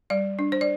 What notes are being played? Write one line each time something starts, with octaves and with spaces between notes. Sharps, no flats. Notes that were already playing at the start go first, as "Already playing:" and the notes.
G3 D5
D4
C5
D5